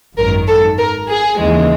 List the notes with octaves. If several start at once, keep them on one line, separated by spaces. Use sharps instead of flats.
G#1 F#2 D#3 A#4
A4
A#4
G#4
D#2 C#3 E3 G#3